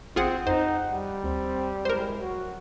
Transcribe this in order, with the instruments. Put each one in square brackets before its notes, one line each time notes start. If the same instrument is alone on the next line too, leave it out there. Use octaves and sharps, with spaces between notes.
[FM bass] A1 [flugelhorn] C4 [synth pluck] F4 G#4 F#5
[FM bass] F2 [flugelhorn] D#4 [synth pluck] C5 [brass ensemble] F#5
[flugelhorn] G3
[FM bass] D2 [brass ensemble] C4
[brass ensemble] F#2 G#3 E4 [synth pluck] A#4 C5
[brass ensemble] F#3 F#4